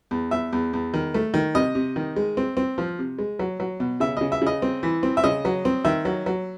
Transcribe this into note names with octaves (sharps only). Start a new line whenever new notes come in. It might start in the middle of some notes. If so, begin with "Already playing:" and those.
E2
E2 E5
E2
E2
D#3
A3
D#3
C3 D#5
C3
D#3
G#3
C4
C4
F3
C3
G#3
F#3
F#3
B2
C#3 E5
C#3 D#5
E5
C#3 D#5
C4
E3
C4
E5
C#3 D#5
F#3
C4
D#3 E5
F#3
F#3